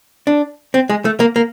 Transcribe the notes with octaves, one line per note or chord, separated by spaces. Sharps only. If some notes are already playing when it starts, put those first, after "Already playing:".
D4
C4
G#3
A3
A#3
A#3